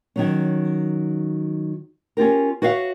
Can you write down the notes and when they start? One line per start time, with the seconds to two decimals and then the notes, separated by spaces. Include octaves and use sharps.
0.16 D#3 F#3 C#4
2.17 C#4 F4 G4 A#4
2.62 F#4 B4 C#5 E5 F5